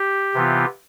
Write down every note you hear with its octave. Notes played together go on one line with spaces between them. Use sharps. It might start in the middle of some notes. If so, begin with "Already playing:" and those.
Already playing: G4
C3 E3 B3 F4